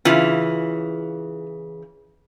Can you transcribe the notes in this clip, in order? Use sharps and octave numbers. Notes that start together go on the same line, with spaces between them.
C#3 E3 F4